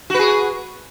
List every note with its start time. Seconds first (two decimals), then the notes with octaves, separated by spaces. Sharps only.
0.10 F#4
0.15 B4
0.19 G#4